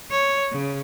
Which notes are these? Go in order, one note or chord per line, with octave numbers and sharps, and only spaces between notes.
C#5
C#3